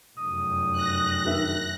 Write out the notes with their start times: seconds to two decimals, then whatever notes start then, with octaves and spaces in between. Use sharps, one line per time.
0.18 F1 F#2 D#6
0.73 F#6 A#6
1.25 D#3 E5